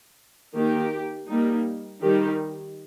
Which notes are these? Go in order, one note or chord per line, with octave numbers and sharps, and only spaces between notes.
D#3 A#3 D#4 G4
G3 A#3 D#4
D#3 G3 D#4 G4